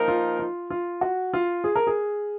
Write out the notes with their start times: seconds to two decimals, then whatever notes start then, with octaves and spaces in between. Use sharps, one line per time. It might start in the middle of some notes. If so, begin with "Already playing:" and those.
Already playing: F3 A#3 D#4 A#4
0.08 F4
0.39 F4
0.70 F4
1.01 F#4
1.34 F4
1.64 G#4
1.76 A#4
1.87 G#4